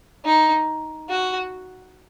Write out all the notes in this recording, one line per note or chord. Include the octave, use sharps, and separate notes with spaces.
D#4
F#4